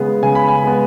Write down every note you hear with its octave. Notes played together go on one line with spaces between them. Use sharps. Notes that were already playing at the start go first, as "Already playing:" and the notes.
Already playing: C#3 G#3 B3 G#4
C#3 G#5
B5
G#5
G#3 B3